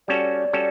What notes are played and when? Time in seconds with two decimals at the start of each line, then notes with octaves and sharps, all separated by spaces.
0.08 G3 C#4 F#4 A4 D5
0.53 G3 C#4 F#4 A4